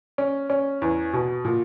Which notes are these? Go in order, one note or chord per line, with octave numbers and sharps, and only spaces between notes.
C#4
C#4
E2
B2
A#2